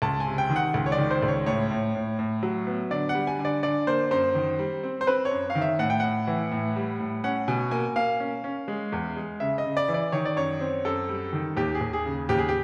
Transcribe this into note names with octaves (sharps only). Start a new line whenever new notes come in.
C#2 A5
G#5
C3
G5
D#3
F#5
C#2
C#5
D5
D#3
C5
C#2
C#5
A2 C#5
A2
A2
A2
F#3
B3
D3 D5
F#5
G3
G#5
D3
D5
D3 D5
A#3 C5
F#2 C5
D#3
G3
C4
C5
C4 B4
C#5
F#2
F5
D#3
E5
A2 F#5
G5
A2 F#5
E3
A2
G3
A2
C#4 F#5
B2 G#5
A#3 G#5
A#3 F5
C#4
C#4
G#3
E2
G#3
C#3 E5
D#5
C#3
D5
E3
D5
D#3 C#5
D5
F#2 C#5
C4
F#2 A4
G3
D#3
D#2 G4
G#4
D#2
G#4
C#3
D#2 G4
G#4
G4